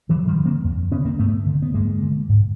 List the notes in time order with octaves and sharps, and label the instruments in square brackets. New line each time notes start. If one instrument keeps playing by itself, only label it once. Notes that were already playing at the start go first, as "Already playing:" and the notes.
[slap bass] F2 E3 F#3
F3 G3
D3
A#3 C4
F2
D3 B3 C#4
A#3 C4
G2 A3 B3
D3
B3
G2 G#3 A#3
D3
G#2